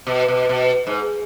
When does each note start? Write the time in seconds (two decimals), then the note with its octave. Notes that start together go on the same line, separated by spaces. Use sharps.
0.07 B2
0.28 B2
0.49 B2
0.87 G#2